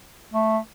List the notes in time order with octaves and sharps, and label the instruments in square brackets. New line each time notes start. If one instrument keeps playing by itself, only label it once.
[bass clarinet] A3